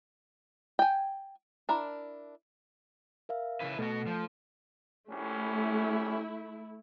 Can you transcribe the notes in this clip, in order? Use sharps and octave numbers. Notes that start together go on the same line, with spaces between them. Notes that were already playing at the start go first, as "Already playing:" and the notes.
G5 G#5
D4 E4 A#4
A#4 E5 F5
C#3 E4 B4
B2 A3 F#4 A4
F3
A#1 A3 C#4 E4 G4